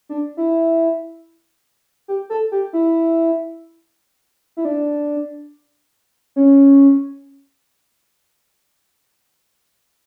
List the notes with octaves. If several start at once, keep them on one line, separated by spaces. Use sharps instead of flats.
D4
E4
G4
A4
G4
E4
E4
D4
C#4